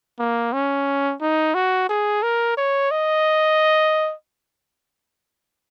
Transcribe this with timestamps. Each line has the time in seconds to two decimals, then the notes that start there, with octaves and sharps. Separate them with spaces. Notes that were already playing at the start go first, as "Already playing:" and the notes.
0.19 A#3
0.53 C#4
1.21 D#4
1.55 F#4
1.89 G#4
2.23 A#4
2.57 C#5
2.91 D#5